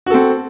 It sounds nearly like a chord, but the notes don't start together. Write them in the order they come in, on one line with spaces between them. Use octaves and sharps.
F#4 A4 C4